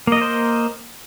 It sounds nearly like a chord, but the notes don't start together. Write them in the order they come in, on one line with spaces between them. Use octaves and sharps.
A#3 D#5 A#4 C5